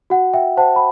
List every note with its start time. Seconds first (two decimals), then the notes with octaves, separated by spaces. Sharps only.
0.10 F#4 F#5
0.34 E5 G5
0.57 C5 F#5 A5
0.76 B5